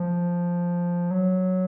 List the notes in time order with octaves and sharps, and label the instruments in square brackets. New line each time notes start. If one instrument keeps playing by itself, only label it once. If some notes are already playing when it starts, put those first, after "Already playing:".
Already playing: [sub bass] F3
F#3